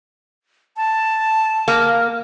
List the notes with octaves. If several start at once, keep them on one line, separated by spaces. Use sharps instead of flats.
A5
A#3